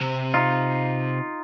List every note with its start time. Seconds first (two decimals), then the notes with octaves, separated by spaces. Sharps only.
0.01 C3
0.34 D#4 F4